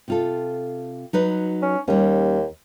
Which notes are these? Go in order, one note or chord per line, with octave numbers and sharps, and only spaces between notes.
C3 F4 A4
F#3 D#4 B4
C#4
D#2 G3 C#4